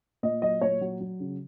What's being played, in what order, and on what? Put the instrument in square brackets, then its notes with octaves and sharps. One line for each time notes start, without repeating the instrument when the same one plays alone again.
[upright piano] A#2 D#5
F#3 D#5
A#2 C#5
F#3
F#3
C#3